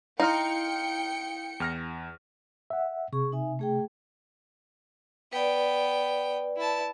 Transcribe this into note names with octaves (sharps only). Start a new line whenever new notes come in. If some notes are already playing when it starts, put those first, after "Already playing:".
D#4 E4 F5 G5 C6 F6 C#7
E2 F6 A#6
E5 F#5
C3 G#4 C#6
D#4 E5 G#5
A3 G#4 G5
B3 B4 D5 G5
E4 A5